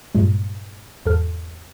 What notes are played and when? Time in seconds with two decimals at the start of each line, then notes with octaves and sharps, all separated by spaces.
0.15 G2 A#2 G#3
1.06 E2 G#2 A4 F6